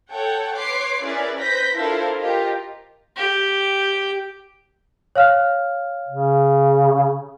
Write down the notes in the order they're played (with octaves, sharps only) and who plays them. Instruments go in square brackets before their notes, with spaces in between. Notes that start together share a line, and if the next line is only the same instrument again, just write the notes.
[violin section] A4 C#5 F#5 G5
B4 C#5 C6 D6 C7
C#4 E4 G#4 A#4 B4 D5
B4 C5 G6 A#6 B6
D4 E4 F4 A4 A#4 C5
F4 G4 A#4 D#5
[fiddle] G4
[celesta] C#5 F5 F6
[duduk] C#3